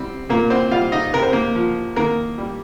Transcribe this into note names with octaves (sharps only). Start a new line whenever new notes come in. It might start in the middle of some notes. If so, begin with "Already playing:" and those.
Already playing: G3 C4
A#2 A#3 A#4
C4 C5
G3 F4 F5
D#4 D#5
C3 A#4
C5
A#3 A#4
F3
D#3 A#3 A#4
G3